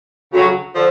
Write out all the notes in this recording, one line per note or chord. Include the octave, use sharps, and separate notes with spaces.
D2 C#3 F#3
D3 F3